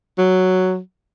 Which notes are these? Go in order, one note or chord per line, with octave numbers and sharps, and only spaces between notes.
F#3